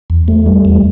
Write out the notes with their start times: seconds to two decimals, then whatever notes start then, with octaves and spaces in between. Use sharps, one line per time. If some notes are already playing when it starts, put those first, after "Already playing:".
0.10 E2
0.28 A3
0.46 G3
0.65 E2